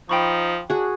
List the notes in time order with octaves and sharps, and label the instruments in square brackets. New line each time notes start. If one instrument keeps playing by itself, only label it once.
[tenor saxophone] F3 [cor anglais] D#4 [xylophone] G5 B5 C#6
[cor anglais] D4 [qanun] F#4 G#4